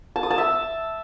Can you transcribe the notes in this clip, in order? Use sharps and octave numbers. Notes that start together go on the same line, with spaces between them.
A5
D#6
A5
E5